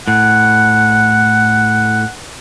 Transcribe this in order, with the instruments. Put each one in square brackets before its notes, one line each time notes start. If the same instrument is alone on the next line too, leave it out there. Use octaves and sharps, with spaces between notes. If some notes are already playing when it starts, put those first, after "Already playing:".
[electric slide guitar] A2 [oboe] F#5